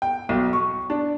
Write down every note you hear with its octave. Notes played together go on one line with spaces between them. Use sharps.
G5
B1
C#6
D4